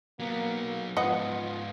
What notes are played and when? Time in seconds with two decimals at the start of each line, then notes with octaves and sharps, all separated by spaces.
0.20 F#3 A#3 B3
0.97 G#2 F3 F4 B4 D#5 F#5